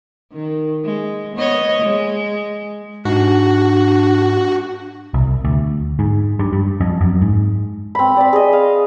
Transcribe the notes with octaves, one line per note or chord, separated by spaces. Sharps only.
D#3
G#3
B3 C#5 D#5
G#3
G#2 D4 F#4
C2
D2
G#2
G2
G2
F2
F#2
G#2
C4 B5
D5 B5
G#4 D#5
F5